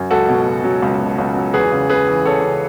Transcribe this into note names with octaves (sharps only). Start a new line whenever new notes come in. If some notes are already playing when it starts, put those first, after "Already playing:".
Already playing: F#2
C#2 F#4 A4
B2
C#2
F#3
C#2
B2
C#2
F#3
E2 G#4 B4
C#3
E2 G#4 B4
E3
E2 A4 C#5
C#3